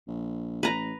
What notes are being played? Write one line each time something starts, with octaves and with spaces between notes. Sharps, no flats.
A#1
A1 B4 A#5